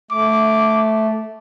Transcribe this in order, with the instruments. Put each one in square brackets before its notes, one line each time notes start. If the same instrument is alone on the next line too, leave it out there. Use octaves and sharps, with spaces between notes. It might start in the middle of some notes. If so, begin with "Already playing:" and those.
[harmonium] A3 [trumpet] D6